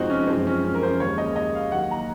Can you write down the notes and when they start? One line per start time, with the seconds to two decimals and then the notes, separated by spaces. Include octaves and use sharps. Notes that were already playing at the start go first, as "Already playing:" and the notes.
Already playing: F2 C3 F3 G#3 C4 D#4 F#4
0.10 C#4
0.28 F#2 F3 G#3 C4
0.47 C#4
0.64 C#4
0.74 A#4
0.83 C5
1.00 D#2 C#3 G#3 C#5
1.18 D#5
1.36 D#5
1.55 F5
1.72 D#2 D#3 F#3 F#5
1.91 A#5